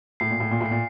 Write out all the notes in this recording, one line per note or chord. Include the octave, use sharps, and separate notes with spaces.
A2 C7
A#2
A2
A#2
A2 C7
A#2